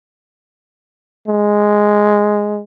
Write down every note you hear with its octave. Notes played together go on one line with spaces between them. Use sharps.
G#3